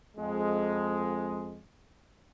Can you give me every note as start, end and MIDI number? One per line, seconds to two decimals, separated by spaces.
0.17 1.61 41
0.17 1.61 56